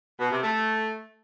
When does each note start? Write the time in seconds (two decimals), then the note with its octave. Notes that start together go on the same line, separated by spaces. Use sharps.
0.19 B2
0.31 C3
0.43 A3